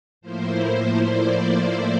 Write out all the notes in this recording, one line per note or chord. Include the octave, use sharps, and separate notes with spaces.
A2 F3 A#3 E4 C5
D5